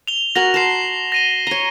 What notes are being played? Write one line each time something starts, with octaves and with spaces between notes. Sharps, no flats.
F7 G7
F#4 A#4 G#5 A#6 F7 F#7
A5 C6 C7 E7
A#6 D#7 G7
C#5 A#5 G7